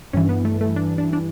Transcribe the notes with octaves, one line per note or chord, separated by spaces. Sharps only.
G2 E3 C#4
B3
A3
A3
D4
D4
D4